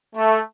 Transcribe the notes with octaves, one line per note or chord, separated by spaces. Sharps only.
A3